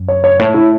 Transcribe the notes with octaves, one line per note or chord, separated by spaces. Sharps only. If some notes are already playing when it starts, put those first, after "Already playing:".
Already playing: F#2
C#5
C#5
A2 C#5
E4